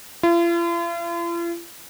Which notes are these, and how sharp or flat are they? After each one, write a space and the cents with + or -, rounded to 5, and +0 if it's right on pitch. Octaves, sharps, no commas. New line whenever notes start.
F4 -45